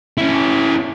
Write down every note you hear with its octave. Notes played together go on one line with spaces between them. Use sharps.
C#4 E4